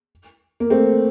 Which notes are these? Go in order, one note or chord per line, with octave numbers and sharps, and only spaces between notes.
A#3
A3 C4